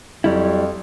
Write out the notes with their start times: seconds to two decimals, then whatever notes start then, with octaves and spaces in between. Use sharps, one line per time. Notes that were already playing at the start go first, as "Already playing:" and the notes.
0.24 F2 F#3 G3 E4